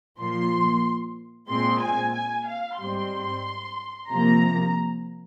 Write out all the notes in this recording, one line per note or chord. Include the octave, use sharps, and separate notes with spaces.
A#2 F3 A#3 C6
A#2 G#3 C4 C6
G#5
G#5
F5
G#2 G3 C4 C6
C3 F3 A#3 A#5